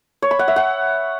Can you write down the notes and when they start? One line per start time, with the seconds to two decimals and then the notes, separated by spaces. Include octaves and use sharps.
0.22 C#5
0.31 B5
0.39 F#5
0.48 E5
0.56 F#5